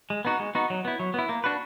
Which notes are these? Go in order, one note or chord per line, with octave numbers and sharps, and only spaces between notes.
G#3
B3 D#4 F#4
G#3
B3 D#4 F#4
F#3
B3 E4
F#3
B3 E4
A#3
D4 F#4 B4